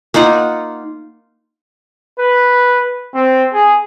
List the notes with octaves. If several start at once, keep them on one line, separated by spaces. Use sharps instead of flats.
A#3 D#4 F4 F#5
B4
C4
G#4